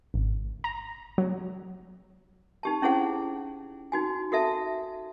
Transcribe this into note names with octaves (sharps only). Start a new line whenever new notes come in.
G#1
A#5
F#3
D#4 G4 A5
C#4 E4 G#4 C5 F#5
D#4 F#4 G#5
F#4 A4 E5 A5